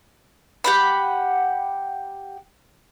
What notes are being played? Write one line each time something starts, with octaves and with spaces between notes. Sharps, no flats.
G4 F#5 B5